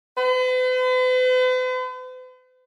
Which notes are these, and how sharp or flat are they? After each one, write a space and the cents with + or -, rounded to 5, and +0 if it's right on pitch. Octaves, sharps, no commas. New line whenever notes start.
B4 +45